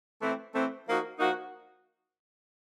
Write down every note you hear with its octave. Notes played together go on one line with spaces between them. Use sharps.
E3 A3 C4
E3 A3 C4
F3 A#3 D#4 F#4
F3 A#3 D#4 F#4